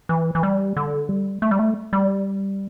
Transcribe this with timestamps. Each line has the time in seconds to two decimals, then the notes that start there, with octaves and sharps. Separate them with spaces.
0.09 E3
0.35 E3
0.43 G3
0.77 D3
1.09 G3
1.42 A3
1.51 G3
1.59 A3
1.93 G3